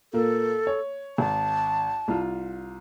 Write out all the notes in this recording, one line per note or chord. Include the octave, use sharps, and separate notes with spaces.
A#2 A#3 A4
C#5
G#1 A5
C2 F4